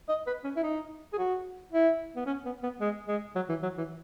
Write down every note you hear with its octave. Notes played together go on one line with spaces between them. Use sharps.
D#5
B4
C#4
E4
D#4
G#4
F#4
E4
B3
C#4
B3
B3
G#3
G#3
F#3
E3
F#3
E3